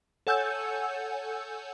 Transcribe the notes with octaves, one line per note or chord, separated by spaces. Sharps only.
A4 C#5 F#5 G#5 E6 G6